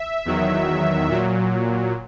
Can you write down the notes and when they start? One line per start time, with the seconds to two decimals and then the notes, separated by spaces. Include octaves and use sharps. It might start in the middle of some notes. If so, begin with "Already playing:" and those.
Already playing: E5
0.26 E2 D#3 F#3
1.10 A#2 F#3